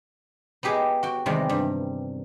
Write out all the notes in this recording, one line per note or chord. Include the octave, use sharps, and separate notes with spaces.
B3 D#4 G4 G#4
F#4 G5
E2 C3 D#3 G3 G#3 A#4
G2